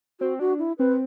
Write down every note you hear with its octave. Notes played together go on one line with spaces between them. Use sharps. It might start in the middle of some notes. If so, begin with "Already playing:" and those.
C4 F#4
D4 F#4
E4
C4 B4